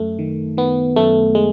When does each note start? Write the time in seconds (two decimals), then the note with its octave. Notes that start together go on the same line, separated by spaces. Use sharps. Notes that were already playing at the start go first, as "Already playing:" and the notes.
Already playing: F#2 A3
0.19 D#3
0.57 D#3 B3
0.96 F#2 A3
1.35 G#3